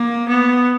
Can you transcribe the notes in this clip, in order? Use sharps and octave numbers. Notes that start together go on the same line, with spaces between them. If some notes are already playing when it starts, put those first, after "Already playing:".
Already playing: A#3
B3